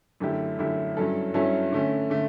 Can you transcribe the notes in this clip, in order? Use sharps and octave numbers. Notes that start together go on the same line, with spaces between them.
F#2 D3 A3 E4 G4
F#2 D3 A3 E4 G4
G2 F#3 C#4 E4 A4
G2 F#3 C#4 E4 A4
D3 A3 C#4
D3 A3